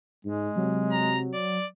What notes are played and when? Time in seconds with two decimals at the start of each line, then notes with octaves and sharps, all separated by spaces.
0.25 G#2 G#3
0.56 C3 F#3
0.92 A#5
1.34 D5